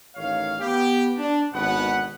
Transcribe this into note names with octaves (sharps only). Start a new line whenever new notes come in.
A1 D#3 C#5 F5
B3 G4
D4
G#1 D2 B2 B3 B4 F#5